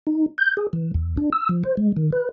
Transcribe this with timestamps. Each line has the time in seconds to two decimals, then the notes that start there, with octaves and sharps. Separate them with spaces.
0.07 D#4
0.38 G6
0.57 G#4
0.73 E3
0.94 E2
1.17 D4
1.33 E6
1.49 F3
1.64 C5
1.77 G#3
1.96 D#3
2.12 B4